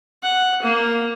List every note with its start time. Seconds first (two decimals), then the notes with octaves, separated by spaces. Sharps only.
0.23 F#5
0.62 A#3